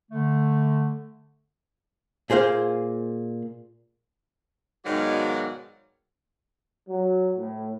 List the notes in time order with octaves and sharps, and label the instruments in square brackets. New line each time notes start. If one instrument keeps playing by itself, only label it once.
[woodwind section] D3 A3
[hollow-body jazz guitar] A#2 G#4 C5 F5
[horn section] G#2 B2 D#3 F#3 D5 F5
[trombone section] F#3
A2